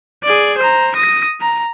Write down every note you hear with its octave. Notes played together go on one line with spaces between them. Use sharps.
G#4 D5
C5 A#5
D#6 A#6
A#5